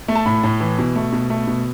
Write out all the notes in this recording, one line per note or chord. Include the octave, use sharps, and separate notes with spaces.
A3
A5
A2 B5
A2
E3
B2
A3
B2
A3
B2